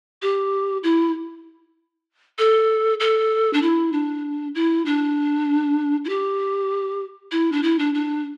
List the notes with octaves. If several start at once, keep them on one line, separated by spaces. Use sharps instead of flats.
G4
E4
A4
A4
D4
E4
D4
E4
D4
E4
G4
E4
D4
E4
D4
D4